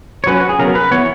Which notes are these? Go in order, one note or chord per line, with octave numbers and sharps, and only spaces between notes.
C#5
F#3 C#4 B4
F#4
G#4
C#3 F#3 B3 A#4
B4
E3 B3 C#5